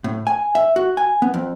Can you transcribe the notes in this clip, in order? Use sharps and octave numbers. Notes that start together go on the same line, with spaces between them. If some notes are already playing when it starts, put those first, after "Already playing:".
A2
G#5
E5
F#4
G#5
B3
F2